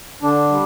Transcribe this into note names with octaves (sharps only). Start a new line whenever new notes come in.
D3 D4
G3